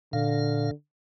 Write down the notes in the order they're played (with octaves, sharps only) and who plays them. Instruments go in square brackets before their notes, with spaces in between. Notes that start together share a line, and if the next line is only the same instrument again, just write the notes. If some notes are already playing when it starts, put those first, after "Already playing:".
[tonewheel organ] A#2 F5 [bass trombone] D3